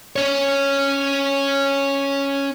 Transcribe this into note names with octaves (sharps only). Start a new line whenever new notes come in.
C#4 C#5